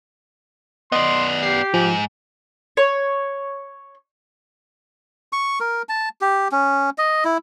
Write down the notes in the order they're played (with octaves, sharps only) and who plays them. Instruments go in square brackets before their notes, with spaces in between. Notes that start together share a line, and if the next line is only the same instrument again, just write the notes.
[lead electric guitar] B3 D5 [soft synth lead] D#5 [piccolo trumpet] C6
[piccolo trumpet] G4 [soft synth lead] C7
[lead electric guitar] G#2 [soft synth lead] F3
[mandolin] C#5
[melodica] C#6
A#4
A5
G4
C#4
D#5
E4